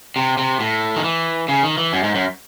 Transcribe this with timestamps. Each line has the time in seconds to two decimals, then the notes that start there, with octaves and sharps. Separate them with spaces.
0.16 C3
0.38 C3
0.60 A2
0.96 D#3
1.04 E3
1.48 C#3
1.63 D#3
1.78 E3
1.93 F#2
2.03 G#2
2.15 F#2